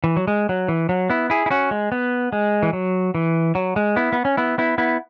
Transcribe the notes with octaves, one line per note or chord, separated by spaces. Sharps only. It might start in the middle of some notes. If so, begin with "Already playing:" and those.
E3
F#3
G#3
F#3
E3
F#3
B3 E4
E4 G#4
E4
C#4 F#4
G#3
B3
G#3
E3
F#3
E3
F#3
G#3
B3 E4
B3
C#4
B3 E4
B3 E4
B3 E4